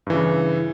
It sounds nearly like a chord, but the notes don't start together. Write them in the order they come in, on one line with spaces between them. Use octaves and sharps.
G2 E3 C#3